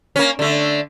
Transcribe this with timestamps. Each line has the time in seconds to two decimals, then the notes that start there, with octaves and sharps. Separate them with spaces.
0.16 A#3 C#4
0.39 D3 A3